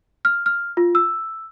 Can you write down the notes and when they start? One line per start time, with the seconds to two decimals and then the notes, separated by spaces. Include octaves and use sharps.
0.25 F6
0.46 F6
0.77 F4
0.95 E6